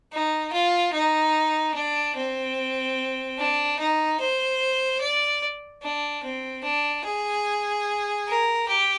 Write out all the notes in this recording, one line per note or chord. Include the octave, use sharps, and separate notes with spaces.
D#4
F4
D#4
D4
C4
D4
D#4
C5
D5
D4
C4
D4
G#4
A#4
G4